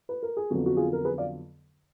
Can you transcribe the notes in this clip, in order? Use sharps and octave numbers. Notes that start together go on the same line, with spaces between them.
B4
A#4
G#4
F2 D3 F#3 B3 F#4
F#4
F4 G#4
A#4
G#4 B4
D5 F5